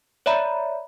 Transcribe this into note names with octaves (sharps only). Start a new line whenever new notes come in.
C#5 D5 E5 A#5 B5